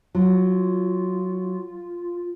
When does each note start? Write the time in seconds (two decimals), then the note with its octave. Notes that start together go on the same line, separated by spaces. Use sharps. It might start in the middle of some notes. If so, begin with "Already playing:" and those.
0.15 F#3 F4